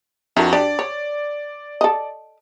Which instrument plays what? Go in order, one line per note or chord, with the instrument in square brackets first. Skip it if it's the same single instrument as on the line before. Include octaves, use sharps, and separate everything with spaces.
[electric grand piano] F2 F#4 [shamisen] D4 E4 A#4
[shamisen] D4 G4 [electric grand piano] D5
[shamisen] C#5
A4 D#5